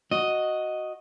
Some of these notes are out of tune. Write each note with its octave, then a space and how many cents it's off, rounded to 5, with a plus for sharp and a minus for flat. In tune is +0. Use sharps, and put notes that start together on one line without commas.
F#4 +0 D#5 +0